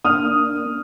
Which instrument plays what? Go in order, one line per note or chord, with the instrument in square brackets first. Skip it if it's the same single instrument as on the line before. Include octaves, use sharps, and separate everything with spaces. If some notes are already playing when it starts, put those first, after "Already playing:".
[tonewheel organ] A#3 D4 [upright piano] D#6 F6